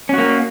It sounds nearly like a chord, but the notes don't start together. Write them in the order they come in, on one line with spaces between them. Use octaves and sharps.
C#4 F#4 A#3